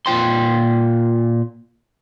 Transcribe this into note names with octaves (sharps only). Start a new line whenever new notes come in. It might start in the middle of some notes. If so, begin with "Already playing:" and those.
A#2 F4 G5 C6